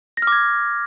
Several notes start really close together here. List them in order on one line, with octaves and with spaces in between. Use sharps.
A#6 F6 D6 G#6